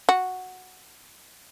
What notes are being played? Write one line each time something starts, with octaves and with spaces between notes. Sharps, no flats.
F#4